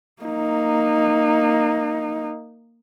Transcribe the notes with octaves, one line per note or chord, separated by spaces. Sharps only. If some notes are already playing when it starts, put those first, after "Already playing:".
A#3 D#4